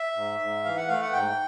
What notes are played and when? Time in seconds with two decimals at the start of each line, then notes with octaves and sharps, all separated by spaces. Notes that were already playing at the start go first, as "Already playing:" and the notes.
Already playing: E5
0.16 G#2
0.40 G#2
0.64 E3 F5
0.77 F#5
0.88 A3 F5
1.01 F#5
1.12 G#2 G5